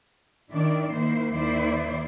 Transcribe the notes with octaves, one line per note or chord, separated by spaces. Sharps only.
D#3 D4 E4 D5
D#3 A#3 E4 C5
D#2 D#3 E4 C5 D5